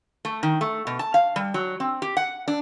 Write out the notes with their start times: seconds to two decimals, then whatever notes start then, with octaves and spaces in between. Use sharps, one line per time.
0.25 A3
0.43 D#3
0.61 A3
0.87 B2
0.99 A5
1.14 F5
1.36 G3
1.54 F#3
1.80 C4
2.02 G4
2.17 F#5
2.48 D4